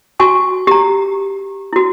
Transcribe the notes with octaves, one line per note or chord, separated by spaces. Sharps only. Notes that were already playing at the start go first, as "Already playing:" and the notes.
F#4 G#5 C#6
G4 A#5
E4 F#4